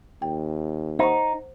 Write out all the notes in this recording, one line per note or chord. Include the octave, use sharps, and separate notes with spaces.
D#2 G5
D#4 C5 F#5 C#6